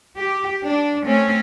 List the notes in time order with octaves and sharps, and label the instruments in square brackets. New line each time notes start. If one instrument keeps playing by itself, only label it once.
[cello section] G4
D4
A3 C4 C#4